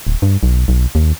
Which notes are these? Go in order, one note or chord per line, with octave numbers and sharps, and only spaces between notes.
D1
G2
B1
B1
D#2